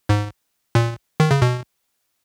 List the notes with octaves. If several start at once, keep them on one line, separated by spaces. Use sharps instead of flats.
G#2
A#2
D#3
C#3
B2